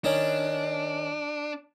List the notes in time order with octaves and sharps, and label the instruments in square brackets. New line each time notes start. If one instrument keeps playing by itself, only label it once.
[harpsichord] D#3 C#4 [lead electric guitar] D4